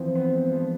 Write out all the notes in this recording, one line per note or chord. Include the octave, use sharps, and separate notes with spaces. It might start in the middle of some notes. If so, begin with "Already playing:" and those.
Already playing: E3 F3 C4
B3
G#3
F3